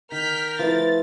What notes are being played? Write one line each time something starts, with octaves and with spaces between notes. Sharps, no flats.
D#3 A#4 F6 G6 B6
F3 A3 E4 B4 A6